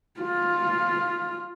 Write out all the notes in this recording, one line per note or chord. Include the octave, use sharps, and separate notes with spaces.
F4